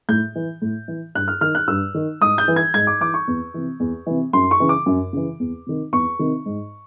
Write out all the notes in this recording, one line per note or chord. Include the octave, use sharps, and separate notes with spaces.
A2 G6
E3
A2
E3
G2 F#6
F6
D#3 F6
F#6
G2 E6
D#3
G#2 D#6
G6
E3
G#6
G#2 G#6
D6
E3 D6
C#6
E2
C3 E3
E2
C3 E3
F#2 C6
C#6
C#3 E3
D6
F#2
C#3 E3
E2
C3 D#3
E2 C#6
C3 D#3
G#2